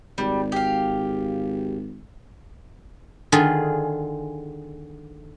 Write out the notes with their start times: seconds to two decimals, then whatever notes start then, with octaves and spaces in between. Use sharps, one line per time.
0.18 G#1 G3
0.52 G4 F5
3.32 D3 D#3 F4 G#4